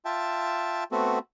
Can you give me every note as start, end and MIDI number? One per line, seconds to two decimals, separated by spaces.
0.05 0.84 65
0.05 0.84 76
0.05 0.84 79
0.05 0.84 81
0.92 1.19 57
0.92 1.19 59
0.92 1.19 60
0.92 1.19 66
0.92 1.19 69